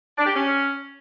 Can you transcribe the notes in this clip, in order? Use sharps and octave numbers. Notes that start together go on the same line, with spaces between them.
D4
G4
C#4